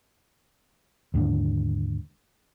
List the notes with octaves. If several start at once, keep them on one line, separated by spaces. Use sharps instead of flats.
D#2 G#2 D3